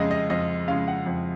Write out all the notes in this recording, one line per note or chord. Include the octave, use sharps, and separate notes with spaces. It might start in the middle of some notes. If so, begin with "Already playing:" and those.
Already playing: F2 C#3 G#3 D#5 F5
D#5
F2 D#5
C#3 G#3 F5
F#5
F2